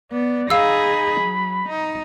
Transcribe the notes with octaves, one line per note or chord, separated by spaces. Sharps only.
B3 D5
D#4 G#4 F5 B5 E6
F#3
D#4